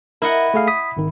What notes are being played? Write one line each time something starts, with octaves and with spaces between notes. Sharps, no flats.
E4 A#4 D#5 F#5
A3 G#4 F5
D#6 B6
G#1 D#3